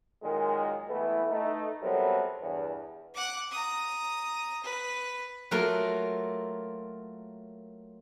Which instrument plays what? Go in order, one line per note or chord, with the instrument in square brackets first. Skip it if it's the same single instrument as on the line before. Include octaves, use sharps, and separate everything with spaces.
[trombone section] A#2 D#3 F#3 G#3
E3 A3 B3 E4 B4
A3 D#4
C3 F#3 G3 B3 A4 A#4
E2 G2
[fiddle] F#5 D6
A#5 D#6
B4
[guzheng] F#3 A3 A#3 F4 A#4